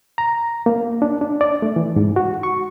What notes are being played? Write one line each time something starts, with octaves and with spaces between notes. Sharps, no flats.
A#5
A#3
D4
D4
D5
A3
E3
G#2
F#4
C#6